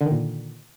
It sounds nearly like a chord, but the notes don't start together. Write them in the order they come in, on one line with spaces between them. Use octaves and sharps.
D3 D#3 A#2